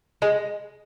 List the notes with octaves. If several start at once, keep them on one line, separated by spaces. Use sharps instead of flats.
G#3